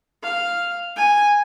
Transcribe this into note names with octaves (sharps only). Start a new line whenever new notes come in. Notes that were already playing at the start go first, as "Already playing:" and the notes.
F5
G#5